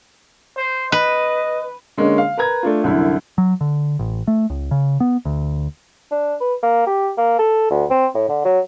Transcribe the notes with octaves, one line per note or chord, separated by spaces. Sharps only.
C5
B4 D#5
D3 G#3 A#3 C#4
F5
A#4 B4 A#5 G#6
A3 D4 F4
C2 F#2 D3 E4
F#3
D3
A1
A3
C#2
C#3
B3
D2
D4
B4
A#3
G4
A#3
A4
D2
C4
A2
D3
F#3